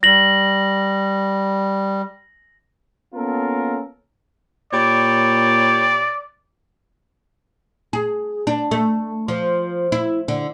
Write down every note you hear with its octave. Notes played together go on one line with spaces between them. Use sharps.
G3 A#6 F#7
A#3 B3 C#4 F4 A4 A#4
A#2 E4 G4 C#5 D5
G#4
D4
A3
F3
E4
D3